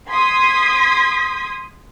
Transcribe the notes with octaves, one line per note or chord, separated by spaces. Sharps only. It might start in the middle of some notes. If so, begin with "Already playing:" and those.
C6 D#6 G#6 B6